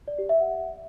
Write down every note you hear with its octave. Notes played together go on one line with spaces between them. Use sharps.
D5
G4
E5
F#5